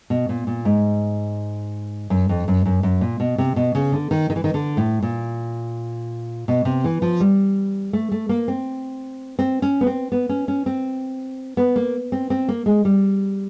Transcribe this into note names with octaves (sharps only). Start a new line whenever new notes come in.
B2
A#2
A#2
G#2
F#2
F2
F#2
F#2
F#2
A#2
B2
C3
B2
C#3
D3
D#3
D#3
E3
D#3
D3
A2
A#2
B2
C3
E3
F3
G3
A3
A3
A#3
C4
C4
C#4
B3
C4
B3
C#4
C#4
C4
B3
A#3
C4
C4
A#3
G#3
G3